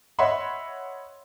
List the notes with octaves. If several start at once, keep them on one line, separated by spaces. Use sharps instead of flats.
C#5 D#5 E5 F#5 B5 C6